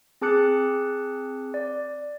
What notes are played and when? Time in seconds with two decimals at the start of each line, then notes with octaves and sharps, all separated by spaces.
0.21 C4 G#4 A5 D6 F#6 C#7
1.54 D5